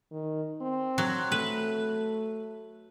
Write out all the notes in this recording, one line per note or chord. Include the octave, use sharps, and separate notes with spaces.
D#3
C4
F#3
A3 B4